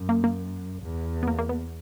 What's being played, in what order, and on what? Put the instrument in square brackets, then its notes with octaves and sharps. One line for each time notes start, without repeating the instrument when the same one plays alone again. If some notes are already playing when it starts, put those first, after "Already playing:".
Already playing: [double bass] F#2
[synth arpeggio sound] A#3
A#3
[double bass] E2
[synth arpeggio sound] B3
A#3
A#3
B3